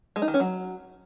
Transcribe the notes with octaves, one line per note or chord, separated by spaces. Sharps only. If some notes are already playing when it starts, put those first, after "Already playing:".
G#3
D#4
D#3
C#4
F#3